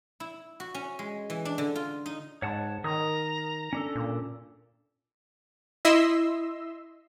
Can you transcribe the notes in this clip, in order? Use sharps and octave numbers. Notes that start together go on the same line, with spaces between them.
E4
F#4
C#4
G#3
E3
D4
D3
F4
D#4
G#2 C#5 F#5 A5
D#3 A#4 A#5 D#6
C#4 D4 A4
A#2
E4 D#5 E5 C6 E6